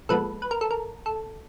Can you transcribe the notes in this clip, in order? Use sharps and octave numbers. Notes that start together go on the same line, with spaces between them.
A#2 F3 G#3 B3 A4 B4
B4
A#4
A4
A#4
A4